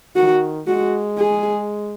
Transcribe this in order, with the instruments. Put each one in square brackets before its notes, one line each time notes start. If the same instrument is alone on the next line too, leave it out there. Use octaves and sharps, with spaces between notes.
[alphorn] D#3 [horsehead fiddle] F#4
[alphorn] G#3 [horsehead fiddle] F#4
[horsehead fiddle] G#4